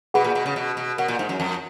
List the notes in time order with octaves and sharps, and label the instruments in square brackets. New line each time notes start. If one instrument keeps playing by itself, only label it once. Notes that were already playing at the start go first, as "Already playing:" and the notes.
[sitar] B2 [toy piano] G#4 B4 F#5 B5
[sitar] A#2
B2
C#3
B2
B2
[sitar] B2 [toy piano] A#4 C#5 F#5
[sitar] A#2
G#2
F#2
F2